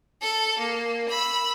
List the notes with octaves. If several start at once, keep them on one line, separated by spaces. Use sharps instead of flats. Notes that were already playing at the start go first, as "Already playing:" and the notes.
A4
A#3
B5 E6